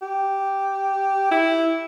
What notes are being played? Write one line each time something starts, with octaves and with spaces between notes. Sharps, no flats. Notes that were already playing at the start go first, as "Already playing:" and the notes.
G4
E4